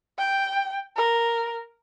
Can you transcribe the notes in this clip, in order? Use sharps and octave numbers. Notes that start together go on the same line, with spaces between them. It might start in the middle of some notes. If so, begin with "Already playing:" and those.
G5
A#4